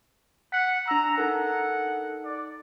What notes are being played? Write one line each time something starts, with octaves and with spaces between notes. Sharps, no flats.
F#5 B6
D4 A#5 E6
D#4 A4 A#4 F#5
D5